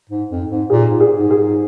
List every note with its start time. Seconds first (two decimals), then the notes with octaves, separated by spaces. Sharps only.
0.10 G#2
0.31 F2
0.50 G#2
0.70 A#2 G#4
0.90 G#2
1.00 G#4
1.10 G#2
1.31 G#4